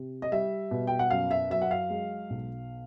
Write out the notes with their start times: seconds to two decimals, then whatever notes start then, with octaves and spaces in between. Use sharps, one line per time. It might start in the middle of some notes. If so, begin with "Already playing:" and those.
Already playing: C3
0.22 D#5
0.32 G3 E5
0.71 B2
0.87 G5
0.99 F#5
1.10 F#2 F5
1.31 E5
1.50 F#3 E5
1.62 F#5
1.71 F5
1.90 G#3
2.30 B1